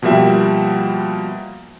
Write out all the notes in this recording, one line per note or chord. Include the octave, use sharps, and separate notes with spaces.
B2 F3 G3 A#3 E5 G5